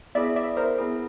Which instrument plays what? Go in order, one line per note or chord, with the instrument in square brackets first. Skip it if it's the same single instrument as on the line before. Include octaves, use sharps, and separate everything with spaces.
[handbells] B3 E4 G#4 [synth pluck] D5 E5
[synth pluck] D5 E5
A#4 C5
[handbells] B3 E4 G#4